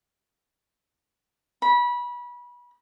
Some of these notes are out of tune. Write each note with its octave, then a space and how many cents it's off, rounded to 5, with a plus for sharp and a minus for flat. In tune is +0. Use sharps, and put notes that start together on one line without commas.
B5 -25